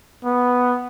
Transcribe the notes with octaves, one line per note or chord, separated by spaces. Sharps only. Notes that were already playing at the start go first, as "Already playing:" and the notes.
B3